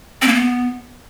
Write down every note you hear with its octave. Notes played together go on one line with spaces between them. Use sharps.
C4
A#3
B3